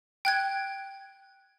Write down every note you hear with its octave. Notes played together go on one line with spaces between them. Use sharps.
G5 F#6 G#6